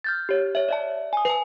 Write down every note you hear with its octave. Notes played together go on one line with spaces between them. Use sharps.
F6 G6 A6
G4 C#5
C#5 E5
D5 E5 A5
G#5 D#6
B4 A5